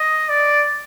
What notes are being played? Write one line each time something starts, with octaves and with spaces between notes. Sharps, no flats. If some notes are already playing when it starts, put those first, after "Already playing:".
Already playing: D#5
D5